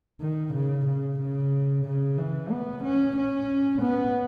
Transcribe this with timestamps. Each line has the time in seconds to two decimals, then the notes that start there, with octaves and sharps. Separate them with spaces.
0.21 D#3
0.54 C#3
0.87 C#3
1.19 C#3
1.85 C#3
2.18 E3
2.51 B3
2.83 C#4
3.16 C#4
3.82 B3